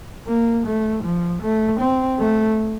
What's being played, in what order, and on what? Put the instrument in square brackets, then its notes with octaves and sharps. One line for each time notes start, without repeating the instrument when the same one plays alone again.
[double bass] A#3
A3
F3
A3
C4
A3